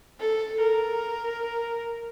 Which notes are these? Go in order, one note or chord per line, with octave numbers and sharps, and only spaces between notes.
A4
A#4